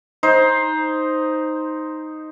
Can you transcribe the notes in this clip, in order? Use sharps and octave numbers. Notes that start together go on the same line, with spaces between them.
D#4 C5